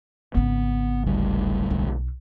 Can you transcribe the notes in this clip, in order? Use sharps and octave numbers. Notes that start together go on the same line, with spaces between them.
G#1 C#3 B3
D1 D2 G3
B1